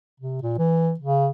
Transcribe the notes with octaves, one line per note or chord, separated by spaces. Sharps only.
C3
A#2
E3
C#3